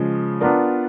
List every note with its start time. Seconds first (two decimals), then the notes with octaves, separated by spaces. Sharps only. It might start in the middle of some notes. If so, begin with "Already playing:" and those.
Already playing: C#3 F3 G#3
0.40 B3 D4 F4 A#4 D5